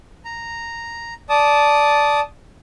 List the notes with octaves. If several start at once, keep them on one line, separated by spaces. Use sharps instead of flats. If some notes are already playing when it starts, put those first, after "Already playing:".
A#5
D5 A5 D#6